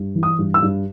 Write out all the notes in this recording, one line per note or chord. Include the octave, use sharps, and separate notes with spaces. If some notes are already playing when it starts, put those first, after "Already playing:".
Already playing: G2
E3
D#6
G2
E6
G2